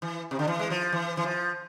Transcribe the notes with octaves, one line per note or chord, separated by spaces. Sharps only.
E3
C3
D3
E3
G#3
F3
E3
E3
F3